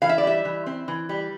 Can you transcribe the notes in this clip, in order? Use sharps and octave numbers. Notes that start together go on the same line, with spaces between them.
E3 F5
E5
D5
G3 E5
E3
C4
E3
G3